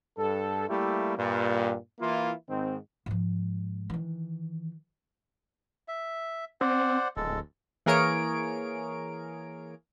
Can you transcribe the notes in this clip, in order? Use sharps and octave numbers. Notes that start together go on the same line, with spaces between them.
G2 A4
G3 A3 A#3 E4 G4
G2 A#2
E3 A#3 E4 F4
G#2 D#3 C4
G#2 F3
D#3 E3
E5
C4 C5 D5 F#5
D1 G#3 A4
E3 A#3 G#4 A#4 C#5 D7